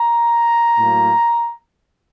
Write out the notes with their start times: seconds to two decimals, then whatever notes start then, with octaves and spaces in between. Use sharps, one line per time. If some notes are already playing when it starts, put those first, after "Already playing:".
Already playing: A#5
0.77 A2 F#3 A#3